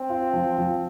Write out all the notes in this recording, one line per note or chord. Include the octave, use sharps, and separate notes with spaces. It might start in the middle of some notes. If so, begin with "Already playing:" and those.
Already playing: C4
F4
F3
F3